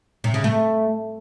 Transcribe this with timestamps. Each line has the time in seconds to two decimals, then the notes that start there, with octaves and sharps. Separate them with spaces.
0.24 C3
0.34 C#3
0.44 A3